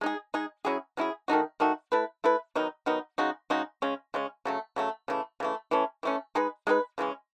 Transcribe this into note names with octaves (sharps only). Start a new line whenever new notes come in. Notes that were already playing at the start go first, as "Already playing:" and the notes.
G#3 D#4 G#4
G#3 D#4 G#4
F#3 C#4 E4 G#4
F#3 C#4 E4 G#4
D#3 A3 D#4 F#4
D#3 A3 D#4 F#4
A3 E4 B4
A3 E4 B4
D#3 F#3 B3 D#4
D#3 F#3 B3 D#4
C#3 G#3 D#4 F#4
C#3 G#3 D#4 F#4
C#3 G#3 C#4
C#3 G#3 C#4
C#3 F#3 A3
C#3 F#3 A3
C#3 E3 A3
C#3 E3 A3
E3 A3 C#4
E3 A3 C#4
G#3 D#4 G#4 B4
G#3 D#4 G#4 B4
C#3 E3 G#3 C#4